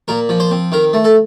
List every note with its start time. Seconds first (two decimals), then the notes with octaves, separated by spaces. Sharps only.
0.08 A#2 A#4
0.29 F3
0.40 C5
0.51 C4
0.72 D#3 A#4
0.93 A3
1.04 A4